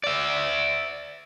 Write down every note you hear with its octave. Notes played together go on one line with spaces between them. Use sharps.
D5 E5